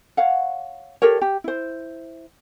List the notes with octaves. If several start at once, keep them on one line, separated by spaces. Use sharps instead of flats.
C#5 F5 F#5
G4 A4 A#4 C#5
G4
E4 C5